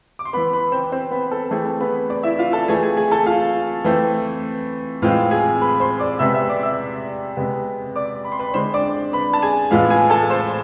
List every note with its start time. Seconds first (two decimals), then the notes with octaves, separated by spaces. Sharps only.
0.19 D6
0.25 C6
0.33 E3 B3 B4 B5
0.53 B4 B5
0.72 C4 C5
0.92 C4 C5
1.11 B3 B4
1.31 A4
1.51 E3 A3 C4 G#4
1.65 A4
1.80 B3 B4
2.10 D4 D5
2.23 E4 E5
2.39 F4 F5
2.53 A4 A5
2.68 E3 A3 C4 G#4 G#5
2.83 G#4 G#5
2.97 G#4 G#5
3.11 A4 A5
3.26 F4 F5
3.85 E3 A3 C4
5.02 A2 E3 G#3 C4 F4 F5
5.31 G#4 G#5
5.61 B4 B5
5.80 C5 C6
6.00 D5 D6
6.19 C3 G#3 B3 E5 E6
6.34 E5 E6
6.49 D5 D6
6.63 E5 E6
7.37 C3 G#3 B3
7.96 D5 D6
8.25 B5
8.32 C6
8.39 B4 B5
8.54 D3 G#3 C4 C5 C6
8.74 D5 D6
9.13 B4 B5
9.33 A5
9.42 G#4 G#5
9.71 A2 E3 G#3 B3 F4 F5
9.90 G#4 G#5
10.10 A4 A5
10.30 C5 C6